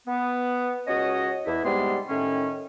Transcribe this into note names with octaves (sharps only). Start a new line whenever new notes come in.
B3
C#2 C#4 F#4 C#5 D#5
E2 E4
G#2 C3 G3 G#3 B3 C6
A2 D#3 C#4